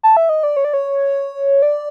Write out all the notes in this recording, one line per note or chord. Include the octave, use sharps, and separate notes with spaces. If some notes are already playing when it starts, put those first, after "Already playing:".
A5
E5
D#5
D5
C#5
D5
C#5
D5